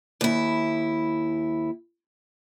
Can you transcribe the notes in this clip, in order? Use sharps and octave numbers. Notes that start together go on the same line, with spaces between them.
D#2 E4